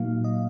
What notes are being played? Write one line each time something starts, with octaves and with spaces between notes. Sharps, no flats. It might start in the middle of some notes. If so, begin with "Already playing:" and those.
Already playing: A#2 F#3 A#3 D#4 F5
D#5